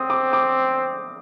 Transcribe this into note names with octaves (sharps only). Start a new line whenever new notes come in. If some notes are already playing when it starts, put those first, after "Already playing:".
Already playing: C4 D#6
D6
D6